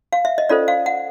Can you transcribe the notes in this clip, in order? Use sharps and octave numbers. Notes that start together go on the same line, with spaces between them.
F5
E5
D#5
C#4 F4 A4 C5 D5
F5
F#5